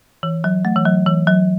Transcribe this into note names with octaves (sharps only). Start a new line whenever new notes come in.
E3
F#3
A3
E3
F#3
E3
F#3